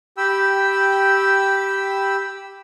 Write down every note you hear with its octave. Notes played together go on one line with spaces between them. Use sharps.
G4 G5 B5 E6